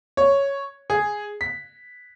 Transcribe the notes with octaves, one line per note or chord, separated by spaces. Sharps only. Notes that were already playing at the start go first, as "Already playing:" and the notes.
C#5
G#4
B6